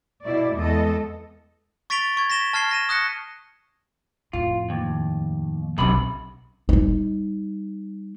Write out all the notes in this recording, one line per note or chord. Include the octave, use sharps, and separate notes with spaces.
B2 E4 D5
E2 G#3 A4 D#5
C#6 A6 B6 D7 F7 G7
C#6 G#6
A#6 B6 E7 G7
A5 F6 G#6 C7 G7
A#6 D#7 E7
D#6 F#6 A#6 C#7
F2 A2 F4
D#2
B1 F#2 C3 D4 B5
G3 D#4